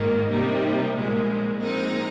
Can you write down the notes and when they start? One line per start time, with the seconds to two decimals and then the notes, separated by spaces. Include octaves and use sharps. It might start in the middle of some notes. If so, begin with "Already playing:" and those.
Already playing: G#1 G#2 D#3 A#3
0.31 C3 G3 A#3 D#4
0.95 A#1 A#2 G#3
1.59 A#1 A#2 G#3 C4 D#4